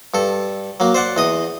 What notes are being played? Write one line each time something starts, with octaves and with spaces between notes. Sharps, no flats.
G2 A4
F#3 A#3
C5 D5 F#5
E2 D#5 D#6